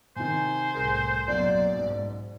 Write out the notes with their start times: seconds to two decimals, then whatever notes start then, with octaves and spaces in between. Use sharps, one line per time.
0.16 C3 D#3 C5 G#5
0.75 C2 A2 G#4 A#4
1.28 B1 F#2 F#3 A#3 D5
1.75 G#2